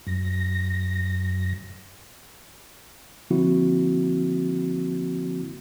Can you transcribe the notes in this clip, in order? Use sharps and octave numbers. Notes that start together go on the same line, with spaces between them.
F#2 A#6
D3 F3 A#3 C4 E4 F#4